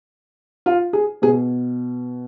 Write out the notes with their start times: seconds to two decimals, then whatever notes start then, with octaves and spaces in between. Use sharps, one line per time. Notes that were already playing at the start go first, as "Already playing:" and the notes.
0.66 F4
0.93 G#4
1.22 B2 G#4